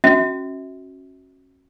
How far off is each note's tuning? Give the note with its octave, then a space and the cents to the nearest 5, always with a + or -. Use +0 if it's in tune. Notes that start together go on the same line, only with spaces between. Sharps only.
C#4 -30 F#4 +0 E5 -35